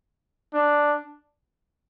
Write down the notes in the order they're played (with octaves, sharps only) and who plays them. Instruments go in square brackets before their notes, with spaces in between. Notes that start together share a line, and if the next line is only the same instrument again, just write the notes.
[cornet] D4